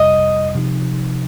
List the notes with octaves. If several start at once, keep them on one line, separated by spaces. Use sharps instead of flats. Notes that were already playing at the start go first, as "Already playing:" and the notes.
Already playing: F2 C3 G3 D#5
C3 F3 D#4